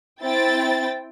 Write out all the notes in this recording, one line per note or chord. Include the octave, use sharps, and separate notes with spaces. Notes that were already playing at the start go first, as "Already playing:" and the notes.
C4 E4 G5 A6